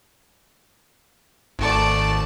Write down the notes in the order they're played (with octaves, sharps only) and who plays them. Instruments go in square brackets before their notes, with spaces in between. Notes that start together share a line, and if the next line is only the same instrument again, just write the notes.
[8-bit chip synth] G#1 A5 [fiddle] A3 D5